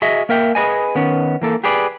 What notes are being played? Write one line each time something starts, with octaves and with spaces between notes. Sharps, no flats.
F#4 G#4 D#5 E5
A#3 A#4 E5 G5
G#4 B4 D#5 G#5
D#3 B3 C#4
E3 A#3 A4
G4 G#4 B4 D5